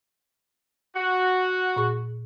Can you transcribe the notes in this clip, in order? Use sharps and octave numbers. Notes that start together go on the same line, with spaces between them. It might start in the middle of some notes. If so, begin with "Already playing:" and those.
F#4
A#2 G#4 C#6